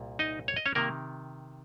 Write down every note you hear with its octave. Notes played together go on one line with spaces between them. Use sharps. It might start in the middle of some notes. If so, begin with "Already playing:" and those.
Already playing: C2 A#2
D#4 D#5
C#5
D#5
C#4 C#5
C3 D#3 A#3 A#4